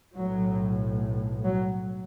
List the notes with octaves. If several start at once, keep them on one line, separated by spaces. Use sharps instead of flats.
B1 A2 F#3
F#3